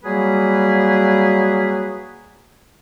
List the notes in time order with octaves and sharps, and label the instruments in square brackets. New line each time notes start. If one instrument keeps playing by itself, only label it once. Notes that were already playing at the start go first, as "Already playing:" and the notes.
[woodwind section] F#3 G3 A#3 G#4 B4